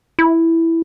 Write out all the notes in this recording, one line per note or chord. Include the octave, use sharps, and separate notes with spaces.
E4